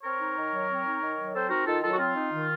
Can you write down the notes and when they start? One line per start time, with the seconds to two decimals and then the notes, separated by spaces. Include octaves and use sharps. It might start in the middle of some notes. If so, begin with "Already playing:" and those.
0.03 C4 A#4 C#5
0.20 D#4
0.36 D#3
0.52 F#3
0.69 C4
0.84 D#4
1.01 D#3
1.18 F#3
1.34 C4 A4 C5
1.50 D#4 F#4 A#4
1.67 D#3 F4 A4
1.83 F#3 F4 A4
1.92 F#4
1.99 C4 F4
2.15 D#4
2.32 D#3